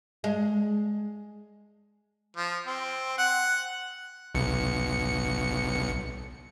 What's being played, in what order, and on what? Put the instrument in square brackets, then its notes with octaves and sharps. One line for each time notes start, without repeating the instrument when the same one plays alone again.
[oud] G#3
[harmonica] F3
C4
F#5
[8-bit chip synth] B1 C#7